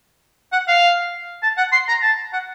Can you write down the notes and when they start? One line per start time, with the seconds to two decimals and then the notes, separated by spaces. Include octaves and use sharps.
0.53 F#5
0.68 F5
1.43 A5
1.58 F#5
1.72 C6
1.88 A#5
2.02 A5
2.33 F#5